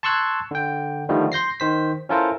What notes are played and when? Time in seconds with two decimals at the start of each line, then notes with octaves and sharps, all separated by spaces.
0.03 A5 C6 C#6 E6 F#6 G#6
0.51 D3 G5
1.09 D3 D#3 F3 G3 A3
1.32 C6 G6 A#6 C7
1.60 D#3 C5 B6
2.09 C#4 E4 F4 A4 A#4 C5